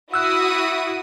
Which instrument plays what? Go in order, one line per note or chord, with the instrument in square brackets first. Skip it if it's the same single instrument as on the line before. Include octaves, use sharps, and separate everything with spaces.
[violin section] E4 F#4 D#6 [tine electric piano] E6 F#6